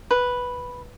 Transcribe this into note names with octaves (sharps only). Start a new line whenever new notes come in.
B4